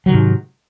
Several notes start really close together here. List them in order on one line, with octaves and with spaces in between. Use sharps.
F#3 D#3 C3 G#2